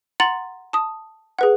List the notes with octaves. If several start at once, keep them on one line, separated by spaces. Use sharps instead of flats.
F#5 A#5 C6 A6 F#7
A5 D#6
G#4 B4 F#5